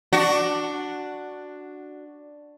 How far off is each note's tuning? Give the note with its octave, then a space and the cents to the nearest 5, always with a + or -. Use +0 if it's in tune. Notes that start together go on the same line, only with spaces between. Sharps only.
D4 +5 F#4 +0